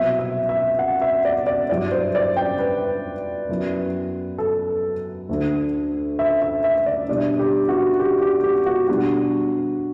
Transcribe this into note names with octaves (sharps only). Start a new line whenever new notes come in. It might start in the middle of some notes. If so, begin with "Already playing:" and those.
Already playing: C2 B2 F#3 C4 E5
E5
E5
F#5
E5
D5
D5
G2 F#3 B3 E4 D5
C5
D5
G5
B4
F#2 F#3 B3 E4
A4
D2 D3 A3 D4
E5
E5
E5
D5
B2 G3 D4 D5
G4
F#4
G4
G4
G4
F#4
B2 G3 D4 F#4